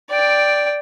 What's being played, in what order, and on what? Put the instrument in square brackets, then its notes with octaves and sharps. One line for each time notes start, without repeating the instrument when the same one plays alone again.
[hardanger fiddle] D5 G5